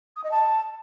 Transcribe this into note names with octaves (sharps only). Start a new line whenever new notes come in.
D#6
D#5
A5